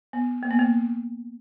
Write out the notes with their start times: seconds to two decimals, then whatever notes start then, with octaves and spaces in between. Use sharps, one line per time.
0.13 B3
0.43 A#3
0.51 B3
0.59 A#3